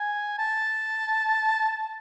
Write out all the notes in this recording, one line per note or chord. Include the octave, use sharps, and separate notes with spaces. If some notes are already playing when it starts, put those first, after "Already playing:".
Already playing: G#5
A5